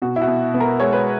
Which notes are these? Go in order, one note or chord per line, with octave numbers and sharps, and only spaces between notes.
B2 F#4
E4
F#4
B2
B3
A#4
G#3 C#5
B4